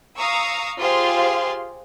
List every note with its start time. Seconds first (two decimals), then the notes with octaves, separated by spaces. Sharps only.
0.17 F5 A#5 C#6 D#6 E6
0.79 F4 G4 G#4 C5 F5 C6